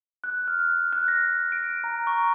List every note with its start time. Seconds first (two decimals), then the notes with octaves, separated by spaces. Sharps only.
0.24 F#6
0.48 F6
0.59 F#6
0.93 F#6
1.08 A#6
1.52 D7
1.84 A#5
2.07 C#6